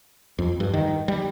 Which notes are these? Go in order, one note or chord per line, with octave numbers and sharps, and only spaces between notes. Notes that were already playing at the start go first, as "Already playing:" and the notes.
F2
G2
D#3
G3